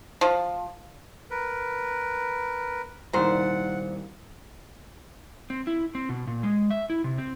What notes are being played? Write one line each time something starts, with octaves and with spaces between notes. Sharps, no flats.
F3
A#4 B4
C2 A#2 D#3 C5 F#5
C4
E4
C4
B2
A#2
G#3
E5
E4
C3
C4